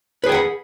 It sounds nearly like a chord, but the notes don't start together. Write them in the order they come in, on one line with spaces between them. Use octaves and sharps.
B4 G#4 G5 F#5 B5